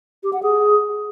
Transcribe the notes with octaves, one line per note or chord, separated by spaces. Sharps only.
G4
F#5
G#4